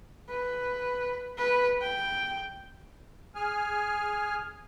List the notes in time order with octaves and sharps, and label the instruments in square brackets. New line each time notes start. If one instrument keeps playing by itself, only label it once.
[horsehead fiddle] B4
B4
G5
[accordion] G#4 G#5 F6